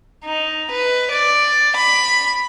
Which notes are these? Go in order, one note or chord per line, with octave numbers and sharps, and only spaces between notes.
D#4
B4
D5
B5